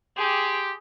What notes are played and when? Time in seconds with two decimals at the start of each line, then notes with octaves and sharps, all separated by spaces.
0.17 G4 G#4 C6